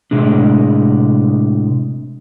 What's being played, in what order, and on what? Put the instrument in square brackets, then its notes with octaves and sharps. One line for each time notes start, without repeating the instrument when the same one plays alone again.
[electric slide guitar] A2 C3 G#3 D4